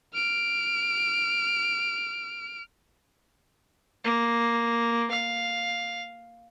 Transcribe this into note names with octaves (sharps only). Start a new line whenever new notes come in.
F6 D7
A#3
F5